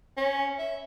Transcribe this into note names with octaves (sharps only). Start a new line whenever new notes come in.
C#4
E5